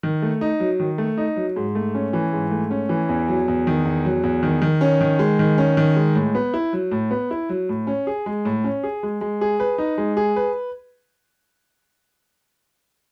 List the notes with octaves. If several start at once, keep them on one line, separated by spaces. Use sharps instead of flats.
D#3
A3
D#4
F#3
D#3
A3
D#4
F#3
G#2
A3
C#4
E3
G#2
A3
C#4
E3
E2
F#3
E2
D#3
E2
F#3
E2
D#3
D#3
C#4
D#3
G#3
D#3
C#4
D#3
G#3
A2
B3
E4
F#3
A2
B3
E4
F#3
A2
C#4
G#4
G#3
A2
C#4
G#4
G#3
G#3
G#4
B4
D#4
G#3
G#4
B4